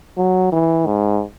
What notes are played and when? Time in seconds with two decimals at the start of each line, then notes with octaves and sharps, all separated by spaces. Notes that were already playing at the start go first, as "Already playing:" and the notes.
0.18 F#3
0.52 E3
0.87 G#2